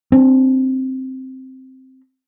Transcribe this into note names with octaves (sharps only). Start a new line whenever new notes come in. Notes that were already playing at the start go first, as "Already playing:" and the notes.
C4 D4